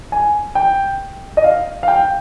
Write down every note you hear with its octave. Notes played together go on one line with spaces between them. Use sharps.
G#5
G5
D#5
F5
F5
G5